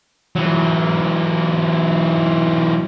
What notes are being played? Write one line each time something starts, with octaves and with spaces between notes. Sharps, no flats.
E3 F#3